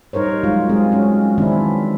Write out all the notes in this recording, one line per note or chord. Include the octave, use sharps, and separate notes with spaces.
G3 D#4 A#4 C5 C#5
F#3 G#3 D#4 F4
G#3 C4 G#4
C#4 F#4
D#3 E3 C4 D4 E4